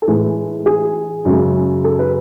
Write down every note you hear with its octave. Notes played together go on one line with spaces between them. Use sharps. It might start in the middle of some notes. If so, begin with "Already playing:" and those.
A4
A2 E3 G#3 B4
G#4
F#2 C#3 G#3
A4
B4